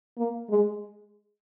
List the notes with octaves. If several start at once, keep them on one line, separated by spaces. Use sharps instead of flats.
A#3
G#3